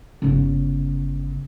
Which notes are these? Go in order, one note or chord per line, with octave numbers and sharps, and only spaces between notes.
G1 C#3